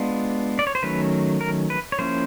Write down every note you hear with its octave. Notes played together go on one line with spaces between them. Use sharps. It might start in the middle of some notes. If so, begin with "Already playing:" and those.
Already playing: G#3 B3 D4 F4
D5
C#5
C5
D#3 F#3 A3 C#4 B4
A#4
B4
C#5
F3 A#3 C#4 E4 C5